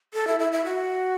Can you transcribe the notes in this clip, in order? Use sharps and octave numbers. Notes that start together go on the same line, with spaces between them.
A4
E4
E4
E4
F#4